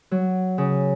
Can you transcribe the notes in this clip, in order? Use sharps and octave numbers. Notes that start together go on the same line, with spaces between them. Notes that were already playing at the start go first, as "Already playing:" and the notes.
F#3
C#3